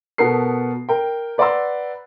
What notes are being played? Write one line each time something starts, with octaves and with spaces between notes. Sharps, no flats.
B2 B3 A4 A#4 C7
A#4 G5
B4 D5 F#5 A#5 C6 E6